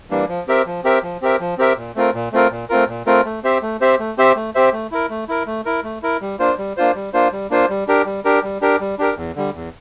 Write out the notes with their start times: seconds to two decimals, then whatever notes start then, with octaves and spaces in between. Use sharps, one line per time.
0.10 E3 G3 A#3 D4
0.29 F3
0.48 C4 G4 A#4 E5
0.66 F3
0.84 C4 G4 A#4 E5
1.03 F3
1.21 C4 G4 A#4 E5
1.40 F3
1.58 C4 G4 A#4 E5
1.77 A#2
1.96 A3 C4 F4 A#4
2.14 A#2
2.32 A3 C4 F4 A#4
2.50 A#2
2.69 A3 C4 F4 A#4
2.88 A#2
3.06 A3 C4 F4 A#4
3.25 A3
3.44 C4 G4 C5 E5
3.62 A3
3.81 C4 G4 C5 E5
3.99 A3
4.18 C4 G4 C5 E5
4.36 A3
4.55 C4 G4 C5 E5
4.72 A3
4.92 E4 A#4
5.10 A3
5.28 E4 A#4
5.46 A3
5.66 E4 A#4
5.84 A3
6.03 E4 A#4
6.21 G3
6.39 A#3 D4 F4 C5
6.58 G3
6.77 A#3 D4 F4 C5
6.95 G3
7.13 A#3 D4 F4 C5
7.32 G3
7.51 A#3 D4 F4 C5
7.69 G3
7.88 D4 G4 A#4
8.06 G3
8.25 D4 G4 A#4
8.43 G3
8.62 D4 G4 A#4
8.80 G3
8.99 D4 G4 A#4
9.17 E2
9.36 D3 G3
9.54 E2